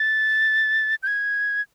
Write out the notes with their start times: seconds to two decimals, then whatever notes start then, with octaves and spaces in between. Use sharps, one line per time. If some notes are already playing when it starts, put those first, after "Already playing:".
Already playing: A6
1.03 G6
1.07 G#6